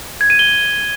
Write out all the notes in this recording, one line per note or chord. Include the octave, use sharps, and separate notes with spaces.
G#6
D#7
G7